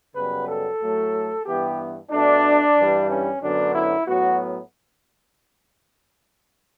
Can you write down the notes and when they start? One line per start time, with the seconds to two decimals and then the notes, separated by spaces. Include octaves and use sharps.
0.15 F#2 C#3 G3 B3 B4
0.48 A4
0.81 A2 F#3 A3
1.46 G2 E3 B3 G4
2.11 B2 A3 D4
2.77 G2 E3 G3
3.10 C#4
3.42 F#2 D3 F#3 B3 D4
3.74 E4
4.07 A2 F#3 B3 F#4